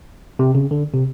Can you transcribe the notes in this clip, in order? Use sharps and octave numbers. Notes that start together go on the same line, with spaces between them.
C3
C#3
D3
C3